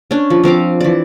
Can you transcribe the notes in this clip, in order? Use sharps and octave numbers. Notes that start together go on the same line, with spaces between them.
C#4 D4
F3
F3 C4 F5 D6
E3 D5